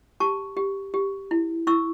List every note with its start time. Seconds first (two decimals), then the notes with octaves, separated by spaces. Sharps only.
0.20 G4 A5 C#6
0.57 G4
0.94 G4
1.31 E4
1.67 E4 C#6 E6